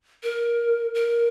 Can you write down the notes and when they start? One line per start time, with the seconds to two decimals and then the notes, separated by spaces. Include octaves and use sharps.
0.23 A#4
0.95 A#4